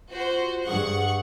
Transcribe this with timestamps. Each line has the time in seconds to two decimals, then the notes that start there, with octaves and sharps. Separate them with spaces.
0.11 F4 F#4 C5
0.66 G2 G#4 F#5 C#6